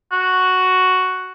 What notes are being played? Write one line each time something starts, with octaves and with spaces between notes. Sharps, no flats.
F#4